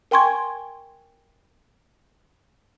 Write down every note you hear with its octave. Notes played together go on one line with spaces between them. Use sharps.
A#4 G5 G#5 C6 C#6 G#6